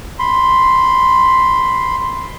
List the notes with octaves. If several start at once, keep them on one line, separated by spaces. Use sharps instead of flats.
B5 C6